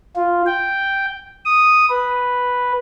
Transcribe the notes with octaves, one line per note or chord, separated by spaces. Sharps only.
F4
G5
D#6
B4